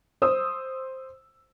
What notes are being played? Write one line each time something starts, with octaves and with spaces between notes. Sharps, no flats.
C5 D#6 E6